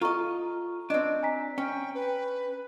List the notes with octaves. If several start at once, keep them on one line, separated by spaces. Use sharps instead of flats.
F4 A4 D#5 A#5 C#6
C4 D4 D#5
G#5 A#5 B6
C#4 G5
B4